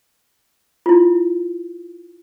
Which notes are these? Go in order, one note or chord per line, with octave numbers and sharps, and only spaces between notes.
E4 F4